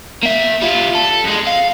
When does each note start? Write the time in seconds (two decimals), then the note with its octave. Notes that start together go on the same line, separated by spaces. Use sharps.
0.23 A#3 E5
0.62 G3 F4
0.95 A4
1.24 F2 G#3
1.47 F5